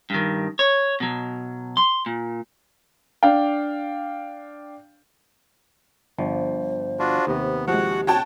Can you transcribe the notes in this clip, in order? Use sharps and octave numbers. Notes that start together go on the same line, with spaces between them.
G2 D#3
C#5
B2 F#3
C6
A#2
D4 F5 G5
G1 F3 C5
D4 F4 F#4
D#2 C3 B3
F3 G#3 F#4 G4 F#5
F#4 C#5 G5 A5